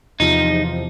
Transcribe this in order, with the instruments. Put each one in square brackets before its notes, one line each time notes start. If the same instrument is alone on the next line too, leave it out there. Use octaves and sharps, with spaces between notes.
[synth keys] E2 C3 F3 [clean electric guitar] D#4